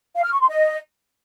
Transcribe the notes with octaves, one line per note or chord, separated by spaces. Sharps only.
F5
F6
C#6
C6
D#5